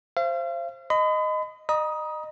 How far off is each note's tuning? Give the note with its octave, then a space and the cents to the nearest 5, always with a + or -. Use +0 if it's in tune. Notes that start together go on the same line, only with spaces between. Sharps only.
C5 +15 F5 -40
D#5 -5 B5 +40
D#5 -30 A#5 +35 D#6 +10